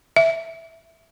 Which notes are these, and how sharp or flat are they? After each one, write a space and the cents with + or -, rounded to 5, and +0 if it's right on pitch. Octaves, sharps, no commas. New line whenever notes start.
E5 -5